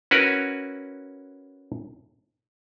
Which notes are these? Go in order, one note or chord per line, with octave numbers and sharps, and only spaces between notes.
C#4 E4 F#4 A#4 B4